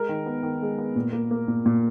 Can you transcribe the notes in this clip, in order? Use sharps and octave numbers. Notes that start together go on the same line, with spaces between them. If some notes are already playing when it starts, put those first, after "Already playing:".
Already playing: G#3 A#4
D#3
B3
D#3
G#3
B3
A#2
A#3
A#3
A#2
A#2